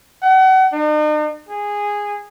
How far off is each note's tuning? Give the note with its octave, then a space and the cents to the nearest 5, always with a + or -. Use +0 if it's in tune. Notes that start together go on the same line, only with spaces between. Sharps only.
F#5 +35
D#4 -45
G#4 -10